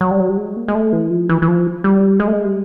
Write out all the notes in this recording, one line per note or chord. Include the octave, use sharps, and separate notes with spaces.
F#3
G3
F#3
G3
G#3
A#3
G#3
A3
E3
F3
E3
E3
F3
G3
G#3
A3
G#3
G3